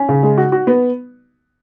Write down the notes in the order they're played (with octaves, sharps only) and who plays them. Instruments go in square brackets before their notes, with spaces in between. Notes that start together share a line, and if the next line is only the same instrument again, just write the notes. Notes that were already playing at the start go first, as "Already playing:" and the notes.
Already playing: [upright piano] C#4
C#3
G#3
F#4
F#4
B3